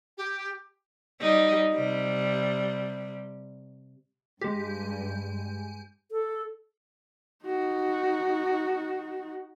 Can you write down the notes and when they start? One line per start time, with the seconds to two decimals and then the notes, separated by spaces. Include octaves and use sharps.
0.18 G4
1.20 G3 D#4
1.74 C3 G3
4.41 G2 G#3 G4
6.11 A4
7.45 D#4 F#4